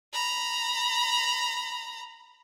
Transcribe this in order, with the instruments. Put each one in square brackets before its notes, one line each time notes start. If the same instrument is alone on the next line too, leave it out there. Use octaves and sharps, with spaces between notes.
[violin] A#5 B5